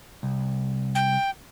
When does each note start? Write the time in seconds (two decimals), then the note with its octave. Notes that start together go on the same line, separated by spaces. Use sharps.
0.23 C2
0.95 G5